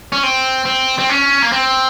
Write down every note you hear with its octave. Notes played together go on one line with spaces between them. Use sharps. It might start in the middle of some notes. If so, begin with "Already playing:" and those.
C#4
C4
C4
C4
C#4
A#3
C4